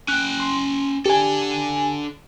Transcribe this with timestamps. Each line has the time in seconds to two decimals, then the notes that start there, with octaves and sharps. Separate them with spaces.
0.08 C#4 G5 F#6
0.40 C6
1.06 D4 G4 A4 G#5